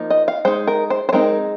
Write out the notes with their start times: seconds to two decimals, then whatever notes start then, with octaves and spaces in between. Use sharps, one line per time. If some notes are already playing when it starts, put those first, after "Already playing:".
Already playing: F3 A#3 D#4
0.10 D#5
0.28 F5
0.45 G#3 D#4 C5
0.67 A#4
0.90 C5
1.09 C5
1.13 G#3 C4 D#4 A#4